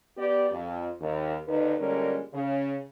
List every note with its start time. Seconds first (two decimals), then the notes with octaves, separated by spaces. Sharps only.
0.17 B3 G4 D5
0.51 F2
1.00 D#2
1.47 D#2 D3 D#3 D#4 B4
1.79 A#2 D3 G3 G#3 C#4 A#4
2.34 C#3